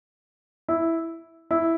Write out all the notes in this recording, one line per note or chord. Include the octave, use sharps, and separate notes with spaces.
E4
E4